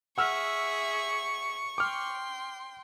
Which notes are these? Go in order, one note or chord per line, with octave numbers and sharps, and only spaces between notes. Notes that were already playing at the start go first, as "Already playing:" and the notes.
G#4 E5 F#5 C#6 E6 F6
G5 C6 D6 F6